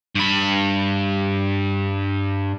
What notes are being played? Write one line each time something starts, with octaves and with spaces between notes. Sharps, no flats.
G2 B5